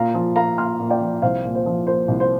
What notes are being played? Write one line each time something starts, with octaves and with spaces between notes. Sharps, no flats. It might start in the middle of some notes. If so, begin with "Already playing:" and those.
Already playing: A#2 F5 A#5
F3
A#3 F5 A#5
A#2 C6 F6
A#2
D5 G5
F3
C2 C5 F5
A#2
C5
F3
A#3 C5
C2
C5